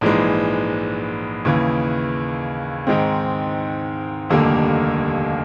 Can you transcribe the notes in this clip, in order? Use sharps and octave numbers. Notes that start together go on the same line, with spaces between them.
A#1 G#2 E3 G#3
D#2 C#3 E3
G#2 D#3 G#3 C4
F1 D#2 D3 G3 A#3